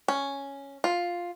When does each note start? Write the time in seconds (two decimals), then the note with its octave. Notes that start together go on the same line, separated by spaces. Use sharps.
0.08 C#4
0.84 F4